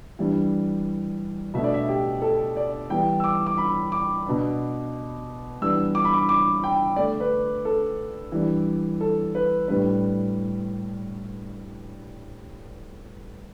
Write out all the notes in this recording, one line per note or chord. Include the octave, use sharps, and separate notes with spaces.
E3 G3 D4
B2 A3 D4 E5
D5
E5
G4
A4
D5
E3 G3 B3 G5
E6
D6
D6
B5
D6
B2 B3 D4
E3 G3 B3 D4 E6
D6
B5
D6
D6
G5
D3 A3 D4 D5
B4
A4
E3 G3 D4
A4
B4
A2 G3 D4 B4